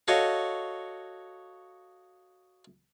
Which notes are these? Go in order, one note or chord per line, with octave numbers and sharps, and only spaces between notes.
F#4 A4 C#5 D#5 F5